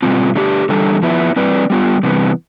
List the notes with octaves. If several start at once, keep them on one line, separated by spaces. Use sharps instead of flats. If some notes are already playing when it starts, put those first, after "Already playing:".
B2 G3 C4 F4
D3 A3 D4 G4
E2 D3 G3 D4 A4
F3 B3 E4
G3 C4 E4 B4 D5
G3 B3 F4
C3 E3 G3 B3